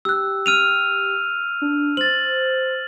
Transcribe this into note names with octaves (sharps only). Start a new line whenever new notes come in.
G4 E6 F#6
F6 D#7 F7
D4
C5 A6 F#7